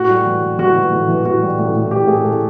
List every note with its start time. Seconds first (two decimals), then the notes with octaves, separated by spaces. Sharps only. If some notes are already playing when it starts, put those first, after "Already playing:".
Already playing: A2 F#4
0.09 G3
0.26 E3
0.43 G3
0.58 E3 F#4
0.76 E3
0.92 A2
1.09 E3
1.25 E3 F#4
1.42 G3
1.59 A2
1.75 A2
1.91 A2 G4
2.08 A2 G#4
2.24 A2 A4